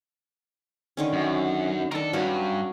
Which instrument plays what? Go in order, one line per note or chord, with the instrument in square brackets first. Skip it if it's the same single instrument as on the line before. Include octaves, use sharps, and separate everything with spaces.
[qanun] D3 D#3 C#4
[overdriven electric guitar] F#2
[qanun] D#3 D4 [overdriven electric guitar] A4 A#4
[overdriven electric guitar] G2 [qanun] F#3 C#4 B5